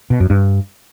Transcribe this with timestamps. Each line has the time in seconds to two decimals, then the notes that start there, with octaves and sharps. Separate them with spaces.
0.10 B2
0.20 F#2
0.30 G2